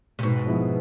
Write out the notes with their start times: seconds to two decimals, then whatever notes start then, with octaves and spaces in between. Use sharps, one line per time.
0.19 C3
0.23 G#2 B2
0.46 F3 G#3 B3 E4